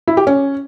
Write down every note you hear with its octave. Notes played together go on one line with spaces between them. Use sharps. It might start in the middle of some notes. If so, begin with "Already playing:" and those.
E4
G4
C#4